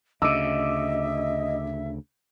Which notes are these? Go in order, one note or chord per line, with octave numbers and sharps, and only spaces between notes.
D2 C#3 D#5 E5 D6 E6